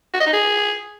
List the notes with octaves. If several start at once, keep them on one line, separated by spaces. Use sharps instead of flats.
F#4
D#5
D#4
G#4